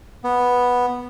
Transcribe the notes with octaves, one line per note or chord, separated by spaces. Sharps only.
B3